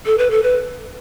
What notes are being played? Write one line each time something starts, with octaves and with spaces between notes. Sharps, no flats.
A4
B4
A4
B4